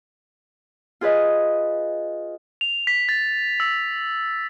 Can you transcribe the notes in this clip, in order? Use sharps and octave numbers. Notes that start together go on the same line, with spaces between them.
F4 G#4 B4 D#5
F7
B6
A6
E6